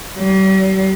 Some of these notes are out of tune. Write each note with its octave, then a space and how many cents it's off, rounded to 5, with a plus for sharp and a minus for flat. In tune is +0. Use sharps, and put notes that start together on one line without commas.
G3 -40